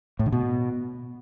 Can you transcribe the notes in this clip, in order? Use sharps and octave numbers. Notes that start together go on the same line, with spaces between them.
A2
D3
B2